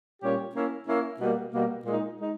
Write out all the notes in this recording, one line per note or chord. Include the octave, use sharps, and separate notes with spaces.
A#2 G3 C#4 G4 C#5
A#3 C#4 E4
A#3 C#4 E4
B2 G3 A#3
B2 G3 A#3
A#2 G#3 D#4
G#3 D#4